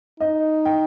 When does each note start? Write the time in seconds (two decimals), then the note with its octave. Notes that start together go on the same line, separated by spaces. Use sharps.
0.20 D#4 D#5
0.65 G5